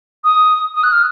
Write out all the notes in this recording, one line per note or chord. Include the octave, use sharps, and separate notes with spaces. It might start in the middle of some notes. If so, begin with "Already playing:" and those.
D#6
D#6
F#6
F6